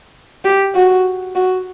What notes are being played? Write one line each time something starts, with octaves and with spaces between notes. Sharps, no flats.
G4
F#4
F#4